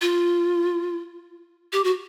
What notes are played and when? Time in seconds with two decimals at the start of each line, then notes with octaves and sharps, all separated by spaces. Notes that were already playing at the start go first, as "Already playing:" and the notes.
0.02 F4
1.73 G4
1.84 F#4